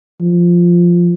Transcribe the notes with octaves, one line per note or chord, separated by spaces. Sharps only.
F3